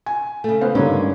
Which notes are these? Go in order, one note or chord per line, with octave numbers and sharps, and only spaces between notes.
G#5
C#3 A3
B3 C5 F5
G2 D3 G#3 A#3 C#4 D#4